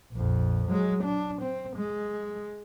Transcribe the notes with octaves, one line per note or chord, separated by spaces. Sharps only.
A#1 F2
F#3 G#3
D4
C4
G#3